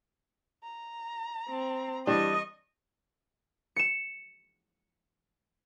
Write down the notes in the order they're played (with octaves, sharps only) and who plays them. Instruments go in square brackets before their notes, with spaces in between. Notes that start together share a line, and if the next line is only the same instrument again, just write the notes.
[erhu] A#5
[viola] C4
[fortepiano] E3 G3 D4 [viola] D#5 [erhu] C#6
[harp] C#7 E7